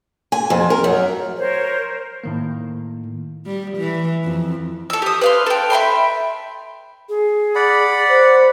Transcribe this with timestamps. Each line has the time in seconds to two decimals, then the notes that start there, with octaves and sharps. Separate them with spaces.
0.32 G#5
0.50 F2
0.70 A#4
0.84 F#2
1.37 A#4 C5 C#5
2.24 A2 D#3 A#3
3.46 G3
3.77 E3
4.24 F2
4.90 A4 E6
5.02 G4 D#6
5.21 B4 F5 C6
5.46 A4 G5
5.70 E5 G5 B5 C6
7.09 G#4
7.55 D5 F#5 B5
8.09 C5